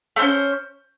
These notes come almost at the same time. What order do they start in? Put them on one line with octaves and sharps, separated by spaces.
A3 C5 C#4